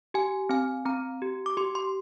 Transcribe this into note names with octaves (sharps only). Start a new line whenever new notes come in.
G4 G#5
C4 G#5
C4 A#5
G4
D6
G4 C6
C6